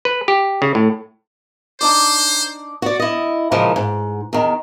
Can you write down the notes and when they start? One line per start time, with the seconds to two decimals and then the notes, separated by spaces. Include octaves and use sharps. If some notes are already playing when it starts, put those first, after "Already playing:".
0.05 B4
0.28 G4
0.62 C#3
0.75 A2
1.81 D4 D#4 C5 D5
2.82 F#4 D5
3.00 E4 D#5
3.51 A#2 C#3 E3 F3 G#3 A#3
3.76 G#2
4.33 E2 D#3